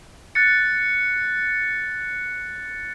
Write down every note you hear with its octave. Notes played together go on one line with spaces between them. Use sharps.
F#6 A6 C#7